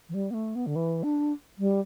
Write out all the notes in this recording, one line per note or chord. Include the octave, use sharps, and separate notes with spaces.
E3
G3
B3
A3
B3
D3
E3
D4
G3